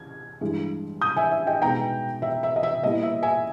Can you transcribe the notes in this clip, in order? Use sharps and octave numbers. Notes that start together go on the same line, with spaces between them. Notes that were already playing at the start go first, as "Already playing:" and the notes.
Already playing: G#6
G2 E3 G#3
D#6 G6
E5 G#5
E5
D#5 G5
B2 G#3 B3 D#4 G5 A#5
E5
E5
D#5
E5
A#2 G3 B3 E4 D#5
E5
E5 G#5